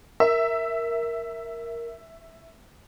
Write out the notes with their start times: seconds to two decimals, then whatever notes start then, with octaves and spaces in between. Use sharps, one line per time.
0.20 A#4 E5